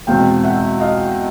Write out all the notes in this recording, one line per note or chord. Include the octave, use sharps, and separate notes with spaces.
E2 B2 G#3 C4 F5 G5
E5 F#5
D#5 F5